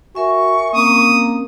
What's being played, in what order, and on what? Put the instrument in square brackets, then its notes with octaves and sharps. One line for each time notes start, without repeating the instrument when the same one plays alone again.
[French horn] F#4 [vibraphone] A#4 E5 G#5 [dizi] C#6
[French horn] A#3 [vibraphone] C4 C#4 A#5 [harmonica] D#6